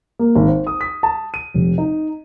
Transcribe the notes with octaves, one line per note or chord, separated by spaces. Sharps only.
A#3
G#1
C5
D#6
B6
A5
D#7
F1
D#4